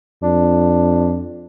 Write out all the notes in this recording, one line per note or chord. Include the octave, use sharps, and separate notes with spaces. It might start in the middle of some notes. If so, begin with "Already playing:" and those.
F2 D4